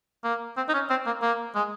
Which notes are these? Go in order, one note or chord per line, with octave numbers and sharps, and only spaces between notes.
A#3
C4
D#4
C#4
C4
A#3
A#3
G#3